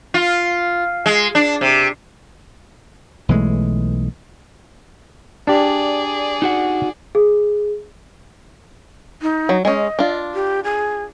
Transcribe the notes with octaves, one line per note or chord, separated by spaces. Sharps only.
F4
G#3
D4
C3
B1 E3 G#3 A3
D4 G4 G#4 D5
D#4 F#4 F#5
G#4
D#4
F#3
G#3 C#4 D#5
D4 F4
G4
G#4